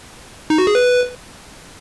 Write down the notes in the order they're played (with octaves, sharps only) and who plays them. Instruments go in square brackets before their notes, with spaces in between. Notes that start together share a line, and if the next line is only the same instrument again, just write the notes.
[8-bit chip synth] D#4
F#4
G#4
B4